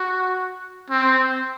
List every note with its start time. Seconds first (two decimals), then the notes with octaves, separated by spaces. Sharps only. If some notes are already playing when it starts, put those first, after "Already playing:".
Already playing: F#4
0.90 C4